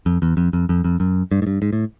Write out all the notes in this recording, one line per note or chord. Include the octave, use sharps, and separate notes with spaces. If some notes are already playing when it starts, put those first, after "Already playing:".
F2
E2
F2
F2
F2
F2
F#2
G2
G#2
G2
G#2
A2